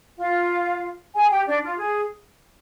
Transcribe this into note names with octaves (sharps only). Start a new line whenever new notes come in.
F4 F5
G#4 G#5
G4 G5
D4 D5
F4
G#4